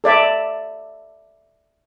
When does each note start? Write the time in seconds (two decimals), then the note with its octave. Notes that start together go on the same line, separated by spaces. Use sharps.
0.04 A4 D5 E5 D6